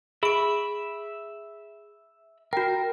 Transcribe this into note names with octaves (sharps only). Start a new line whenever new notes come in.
G#4 E5 B5 D7
F#4 A#4 G5